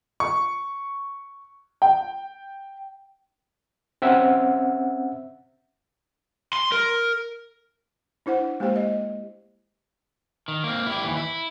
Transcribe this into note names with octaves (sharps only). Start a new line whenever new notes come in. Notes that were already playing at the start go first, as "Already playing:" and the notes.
C#6
G5
C4 C#4 E5 F#5
C6
A#4
D4 E4 C5 F#5
G#3 A#3 G4 C5 G5
D#5
D#3
A#3 C4
E4 G4
D#2 E3
E4